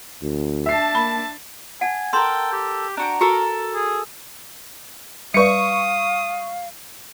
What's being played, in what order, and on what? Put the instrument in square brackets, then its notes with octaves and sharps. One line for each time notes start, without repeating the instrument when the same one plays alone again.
[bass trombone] D2
[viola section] D4 A5 [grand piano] E5 C7
[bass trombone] A#3 [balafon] B5
[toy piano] F#5 A5 [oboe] G#5
[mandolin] A4 A#4 [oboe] G5 [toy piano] C6
[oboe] G4
[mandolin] D4 F#4 G5 [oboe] A#5
[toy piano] F#4 [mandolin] A4 A#4 C#6
[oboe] G#4
[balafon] G3 B4 D5 [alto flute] F5 [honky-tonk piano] C#6 C#7 [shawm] D#6